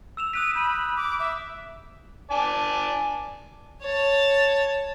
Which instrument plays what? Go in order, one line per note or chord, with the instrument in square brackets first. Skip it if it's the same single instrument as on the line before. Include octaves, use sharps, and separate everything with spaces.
[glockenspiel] E6 E7 F7
[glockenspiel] D#6 F#6 B6 [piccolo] D#7
[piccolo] B5 [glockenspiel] G6
[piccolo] D6
E5
[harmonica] D5 G#5 A5
[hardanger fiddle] C#5 A5